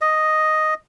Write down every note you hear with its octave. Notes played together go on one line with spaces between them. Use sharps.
D#5